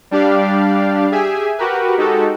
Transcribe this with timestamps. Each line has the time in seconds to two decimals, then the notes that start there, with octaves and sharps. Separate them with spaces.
0.11 G3 D4 G4 D5 F5
1.12 G4 G#4 E5 G#5
1.58 F#4 G4 A#4 B4
1.98 G#3 D#4 F#4 G4 A4